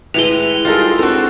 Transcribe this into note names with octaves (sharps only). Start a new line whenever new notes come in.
A2 G#3 E4 B4 F7 G7
G3 D#4 F4 G#4 A4
C4 D4 F#4 A4